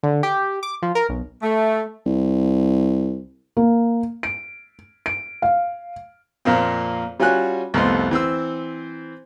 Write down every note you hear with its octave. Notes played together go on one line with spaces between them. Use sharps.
D3
G4
D6
F3
A#4
B1
A3
C2
A#3
D7
D7
F5
F2 A#2 A#3 C4
G3 C#4 F4 F#4 G#5 F#6
C2 F2 A3 B3 D#5 C6
E3 C4 C5 E6